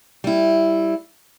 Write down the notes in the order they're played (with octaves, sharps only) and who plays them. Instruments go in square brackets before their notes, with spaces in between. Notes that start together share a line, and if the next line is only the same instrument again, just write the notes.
[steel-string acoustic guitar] G3 E4